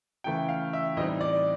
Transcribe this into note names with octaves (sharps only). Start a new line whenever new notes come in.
C#3 E3 A3 G5
F5
E5
A2 E3 G3 C4 D#4 D#5
D5